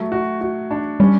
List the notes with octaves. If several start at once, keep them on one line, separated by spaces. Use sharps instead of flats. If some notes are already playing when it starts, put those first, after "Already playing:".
Already playing: F#3 A3
F#4
F#4
D4
G3 C#4